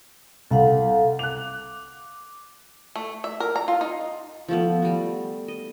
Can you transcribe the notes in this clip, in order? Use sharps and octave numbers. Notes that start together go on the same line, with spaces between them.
C2 A4 F5 F#5
D6 F#6 F7
A3
E5
A#4
A#5
F4
D#4
F3 A3 B3
G3 F#4
D#5